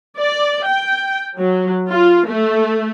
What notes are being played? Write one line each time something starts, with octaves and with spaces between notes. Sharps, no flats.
D5
G5
F#3
F4
A3